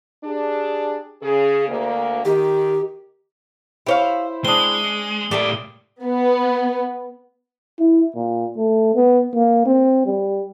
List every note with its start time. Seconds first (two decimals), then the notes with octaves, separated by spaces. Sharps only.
0.24 D4 G4 G#4
1.22 C#3 G#4
1.68 D2 A#3
2.25 D#3 G4
3.86 E4 G4 C5 C#5 F5
4.45 G#3 C4 D4 D#6 G7
5.31 A2 G3 A3 A#3 D5
6.02 B3
7.79 E4
8.16 A#2
8.57 A3
8.95 B3
9.34 A#3
9.66 C4
10.06 G3